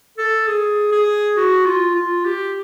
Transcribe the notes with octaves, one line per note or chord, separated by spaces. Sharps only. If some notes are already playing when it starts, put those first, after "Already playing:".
A4
G#4
G#4
F#4
F4
F4
G4